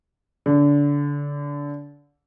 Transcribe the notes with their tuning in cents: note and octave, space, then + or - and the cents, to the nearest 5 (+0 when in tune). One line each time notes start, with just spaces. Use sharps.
D3 -25